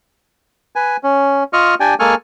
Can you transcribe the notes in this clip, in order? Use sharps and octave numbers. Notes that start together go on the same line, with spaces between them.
B4 G#5
C#4
F4 D#5 C#6 F6
D4 G4 D5 G5 G#5
G#3 A#3 A4 G#5 C#6 F6